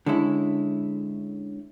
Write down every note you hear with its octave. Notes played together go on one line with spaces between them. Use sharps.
D3 G#3 C#4 E4